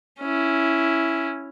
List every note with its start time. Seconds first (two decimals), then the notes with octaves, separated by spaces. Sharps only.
0.20 C#4 E4